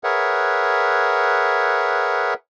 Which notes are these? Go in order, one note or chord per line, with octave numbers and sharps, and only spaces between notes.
G#4 A#4 B4 C#5 E5 F#5